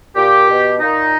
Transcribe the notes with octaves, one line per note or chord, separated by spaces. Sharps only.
A#2 G4
B2
A#2 D#4